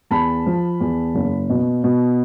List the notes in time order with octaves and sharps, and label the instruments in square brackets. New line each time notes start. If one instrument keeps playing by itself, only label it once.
[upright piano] E2 A5 B5
F3
E2
F#1
B2
B2